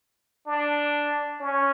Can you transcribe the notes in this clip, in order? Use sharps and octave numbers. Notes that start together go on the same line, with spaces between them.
D4
C#4